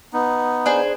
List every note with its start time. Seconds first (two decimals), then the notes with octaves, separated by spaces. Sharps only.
0.13 B3 D#4
0.66 D4 G#4 C5